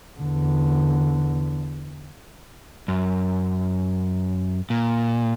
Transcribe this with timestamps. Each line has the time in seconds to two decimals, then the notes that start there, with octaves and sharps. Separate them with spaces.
0.20 E2 D3
2.88 F#2
4.70 A#2